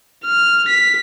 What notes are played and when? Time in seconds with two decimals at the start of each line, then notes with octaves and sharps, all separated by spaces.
0.25 F6
0.68 B6